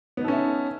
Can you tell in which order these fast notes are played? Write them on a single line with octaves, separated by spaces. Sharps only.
B3 D#4 A4 C#4 E5